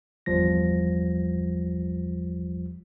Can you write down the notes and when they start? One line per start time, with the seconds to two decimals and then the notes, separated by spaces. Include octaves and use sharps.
0.26 G1 E2 F3 G3 A#6